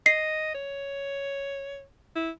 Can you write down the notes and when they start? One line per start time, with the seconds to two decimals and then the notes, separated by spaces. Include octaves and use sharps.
0.06 D#5 C7
0.55 C#5
2.16 E4